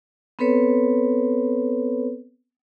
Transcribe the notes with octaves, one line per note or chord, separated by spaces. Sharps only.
B3 C4 A4 B4 C#5